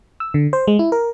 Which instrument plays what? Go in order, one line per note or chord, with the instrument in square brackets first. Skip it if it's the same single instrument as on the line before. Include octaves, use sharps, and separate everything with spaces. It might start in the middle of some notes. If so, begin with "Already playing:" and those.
[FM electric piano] E6
D3
C5
G#3
E4
A#4